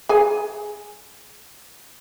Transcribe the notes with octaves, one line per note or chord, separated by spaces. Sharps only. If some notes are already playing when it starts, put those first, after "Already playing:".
G#4 G#5